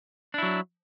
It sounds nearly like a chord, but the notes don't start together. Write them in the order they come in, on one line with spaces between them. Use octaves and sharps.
D4 E4 F#3